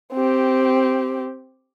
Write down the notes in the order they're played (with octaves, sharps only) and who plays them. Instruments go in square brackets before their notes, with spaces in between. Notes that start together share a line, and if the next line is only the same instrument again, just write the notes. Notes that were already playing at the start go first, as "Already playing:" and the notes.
[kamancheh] C4 G4